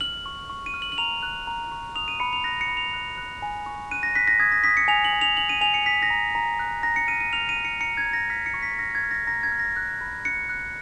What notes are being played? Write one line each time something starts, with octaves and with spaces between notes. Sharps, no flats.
F6 F#7
C#6
C#6
D#7
F6
F#7
F#7
A#5 F7
F#6
A#5
C#6
D#6 F7
D#7
B5 C#7
F7
F#6 A#6
C#7
B5
F7
F#6
F#6
G#5
C#6
F#6 D#7
A#6
F#6 B6
A#6
D#6 G#6
A#6
D#6 B6
C#7
G#5 F7
F#7
G#5
F7
G#5 F#7
D#7
G#5 F7
C#7
D#6 B6
A#6
A#5
A#5
F#6
A#5 A#6
C#7
F6 D#7
D#7
F6 F7
D#7
A#5
C#7
A#5 C#7
G#6
A#5
A#6
F6 B6
C#7
C#6
B6
F6 A#6
G#6
F6
A#6
A#5 A#6
G#6
F6
A#6
F#6
B5
F#6 C#7
F#6